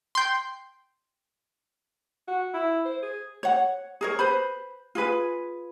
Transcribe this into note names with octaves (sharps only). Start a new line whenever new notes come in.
G5 C6
F#4
E4
C5
G#4
C#5 F#5
G#4 A#4 C#5
B4 C5 B5
F4 G#4 B4 G#5